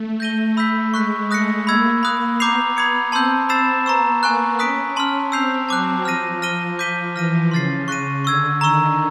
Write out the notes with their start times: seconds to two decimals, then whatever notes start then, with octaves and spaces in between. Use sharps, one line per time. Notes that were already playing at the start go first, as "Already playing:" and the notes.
Already playing: A3
0.20 G6 A#6 D#7 G7
0.57 B5 E6 G6 B6
0.94 G#3 C#6 F#6 B6
1.30 A3 D#6 F#6 A#6 C#7
1.67 A#3 B5 E6 G#6
2.03 B5 D#6 F#6
2.40 B3 A#5 D6 G6 C7 F7
2.77 B5 D#6 G#6 C#7
3.12 C4 A5 C6 E6 G6
3.49 C4 B5 E6 A6 C7 E7
3.86 B3 A#5 C#6 E6
4.22 A#3 G#5 C#6 F#6
4.59 C#4 D#6 F#6 B6 D7
4.96 A5 C6 F6
5.32 C4 E6 G6 C7 F7
5.69 F#3 A5 D6 F#6
6.05 F3 F6 A#6 D#7
6.42 F6 A#6 D#7 G7
6.79 D6 G6 B6 D#7 G7
7.15 E3 F6 A#6 D#7
7.51 C#3 C6 F6 A6 C7
7.88 C#6 F#6 A#6 D#7
8.25 D3 C#6 E6 G#6
8.61 D#3 A#5 C#6 E6